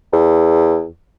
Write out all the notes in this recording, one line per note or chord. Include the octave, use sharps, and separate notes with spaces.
E2